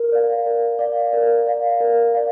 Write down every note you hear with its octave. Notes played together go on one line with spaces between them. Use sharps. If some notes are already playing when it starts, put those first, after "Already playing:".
Already playing: A#4
D5 F5
A#4
D5 F5
A#4
D5 F5
A#4
D5 F5